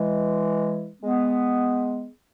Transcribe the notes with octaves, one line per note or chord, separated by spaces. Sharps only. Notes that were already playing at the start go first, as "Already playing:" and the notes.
Already playing: E3 G#3
G#3 B3